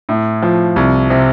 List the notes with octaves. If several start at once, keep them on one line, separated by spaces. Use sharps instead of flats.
A2
F3
C2
C3